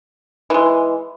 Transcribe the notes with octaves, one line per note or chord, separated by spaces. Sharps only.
E3 G#3